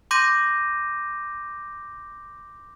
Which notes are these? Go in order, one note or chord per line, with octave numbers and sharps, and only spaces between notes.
C6 D6 G6 A#6 D#7